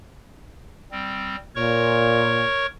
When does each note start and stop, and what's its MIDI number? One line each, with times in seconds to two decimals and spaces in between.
0.92 1.36 55
0.92 1.36 60
1.56 2.43 46
1.56 2.66 70
1.56 2.66 73
1.56 2.66 85